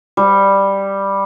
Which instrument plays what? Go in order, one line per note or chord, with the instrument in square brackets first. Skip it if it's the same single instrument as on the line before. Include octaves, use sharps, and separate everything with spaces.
[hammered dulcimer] G3